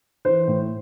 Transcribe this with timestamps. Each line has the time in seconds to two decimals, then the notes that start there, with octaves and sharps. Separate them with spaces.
0.25 E3 C5
0.47 A2